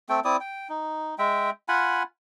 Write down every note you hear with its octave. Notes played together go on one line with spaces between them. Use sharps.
A3 C4 A4 G5
C4 E4 D5 D#6
G5
D#4
G#3 E5 G5
F4 F#5 G#5 B5